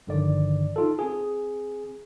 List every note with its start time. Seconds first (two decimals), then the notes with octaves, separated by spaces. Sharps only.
0.07 G1 G2 D3 D#3 F3 D5
0.76 D#4 F4 A4
0.99 C4 G#4